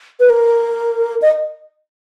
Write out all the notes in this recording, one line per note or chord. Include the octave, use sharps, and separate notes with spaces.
B4
A#4
D#5